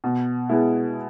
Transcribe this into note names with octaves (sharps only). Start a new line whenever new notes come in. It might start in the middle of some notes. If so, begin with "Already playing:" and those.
B2
G#3 B3 E4